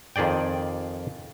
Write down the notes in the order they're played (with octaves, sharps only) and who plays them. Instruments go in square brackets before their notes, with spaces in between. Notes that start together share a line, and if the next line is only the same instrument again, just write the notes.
[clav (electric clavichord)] F2 D#3 G#4 D5 G5